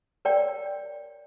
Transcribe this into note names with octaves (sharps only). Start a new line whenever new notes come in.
A#4 C#5 D5 G5